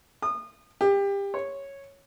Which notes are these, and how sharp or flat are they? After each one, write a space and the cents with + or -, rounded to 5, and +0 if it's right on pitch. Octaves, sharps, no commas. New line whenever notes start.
D#6 -30
G4 +25
C#5 -5